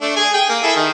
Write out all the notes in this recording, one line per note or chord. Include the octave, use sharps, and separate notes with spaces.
A3 D4
G#4 G#5
G#4 G5
A#3
E4 G#4 A4
D#3